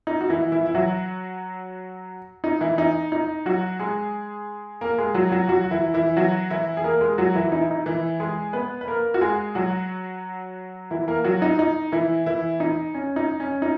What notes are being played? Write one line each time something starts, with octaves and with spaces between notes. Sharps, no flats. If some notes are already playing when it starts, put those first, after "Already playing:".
D#4
F#4
E3 E4
E3 E4
E4
F#3 F#4
D#4
E3 E4
D#4
D#4
F#3 F#4
G#3 G#4
A#3 A#4
G#3 G#4
F#3 F#4
F#3 F#4
F#3 F#4
E3 E4
E3 E4
F#3 F#4
E3 E4
G#4
A#3 A#4
G#3 G#4
F#3 F#4
E3 E4
D#4
E4
D#4
E3 E4
G#3 G#4
B3 B4
B4
A#3 A#4
F#4
G#3 G#4
F#3 F#4
E3 E4
A#3 A#4
F#3 F#4
D#4
D#4
E3 E4
E3 E4
D#4
C#4
D#4
C#4
D#4